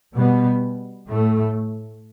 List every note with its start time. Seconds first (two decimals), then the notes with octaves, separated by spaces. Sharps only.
0.14 B2 G3 B3
1.08 A2 A3